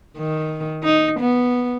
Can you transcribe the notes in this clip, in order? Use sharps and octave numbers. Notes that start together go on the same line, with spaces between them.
D#3
D#4
B3